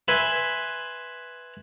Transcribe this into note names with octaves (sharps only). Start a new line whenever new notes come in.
B4 E5 G#5 C6